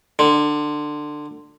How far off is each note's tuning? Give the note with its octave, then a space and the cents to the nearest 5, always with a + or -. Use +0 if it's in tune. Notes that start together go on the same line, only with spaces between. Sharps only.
D3 +20